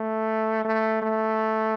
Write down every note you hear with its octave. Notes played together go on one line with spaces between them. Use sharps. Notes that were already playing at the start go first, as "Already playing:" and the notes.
Already playing: A3
A3
A3